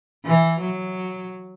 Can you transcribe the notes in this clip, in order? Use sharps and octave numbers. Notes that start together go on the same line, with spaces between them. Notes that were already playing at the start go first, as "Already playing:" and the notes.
E3
F#3